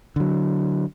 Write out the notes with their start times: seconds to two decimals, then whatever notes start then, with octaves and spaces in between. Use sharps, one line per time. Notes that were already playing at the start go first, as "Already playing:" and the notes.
0.16 D3 F#3